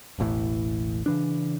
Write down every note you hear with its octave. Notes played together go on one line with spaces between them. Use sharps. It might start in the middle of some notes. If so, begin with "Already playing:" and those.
E1 A1 A2 E3
C#3 E3 D4